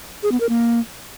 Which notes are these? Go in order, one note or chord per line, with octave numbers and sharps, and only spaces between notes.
G#4
B3
A#4
A#3